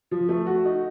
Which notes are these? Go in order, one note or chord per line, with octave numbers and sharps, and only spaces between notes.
F3
A3
F#4
D#4